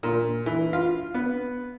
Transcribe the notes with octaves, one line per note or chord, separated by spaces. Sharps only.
A#2
E3
F4
B3